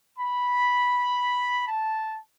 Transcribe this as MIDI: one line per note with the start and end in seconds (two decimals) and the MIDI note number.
0.19 1.66 83
1.68 2.15 81